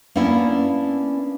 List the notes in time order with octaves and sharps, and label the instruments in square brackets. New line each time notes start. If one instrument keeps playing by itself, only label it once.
[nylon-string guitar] A#3 B3 C#4 D4 E4